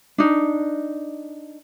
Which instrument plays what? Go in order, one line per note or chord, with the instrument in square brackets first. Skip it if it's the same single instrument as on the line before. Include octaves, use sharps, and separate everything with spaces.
[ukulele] D4 D#4